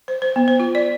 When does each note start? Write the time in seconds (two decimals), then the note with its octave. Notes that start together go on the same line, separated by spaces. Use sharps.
0.08 C5
0.22 C5
0.36 B3
0.48 C5
0.60 F4
0.75 D5